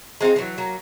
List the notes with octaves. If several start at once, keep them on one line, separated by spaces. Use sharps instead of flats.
G#3 C4 D#4 F4
E3 F#3
F#3 A#3